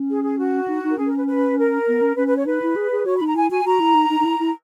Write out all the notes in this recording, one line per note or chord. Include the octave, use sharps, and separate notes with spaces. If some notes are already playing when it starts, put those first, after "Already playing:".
Already playing: C#4
G#4
G#4
F#4
D#4
D#4
A#4
C#4 G#4
A#4
B4
B4
A#4
B3
C#4
C#4 B4
B4
C#5
D#4 B4
E4
G#4
G#4
F#4 C#5
B5
D#4 A#5
E4 G#5
F#4 G#5
F#4 A#5
E4
D#4
D#4
D#4
E4
E4